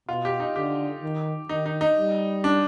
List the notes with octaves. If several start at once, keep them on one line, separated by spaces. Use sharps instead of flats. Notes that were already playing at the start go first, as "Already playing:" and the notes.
B2 F4
G4
D#4
D3 G4
D#3
D#3 D#4
D#4
D#4
G3
D4